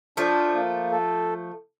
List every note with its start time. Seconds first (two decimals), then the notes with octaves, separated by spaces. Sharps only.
0.17 F3 A3 D4
0.55 A#3
0.91 A4